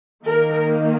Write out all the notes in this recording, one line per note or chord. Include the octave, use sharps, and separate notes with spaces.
D#3 A#3 D#4 A#4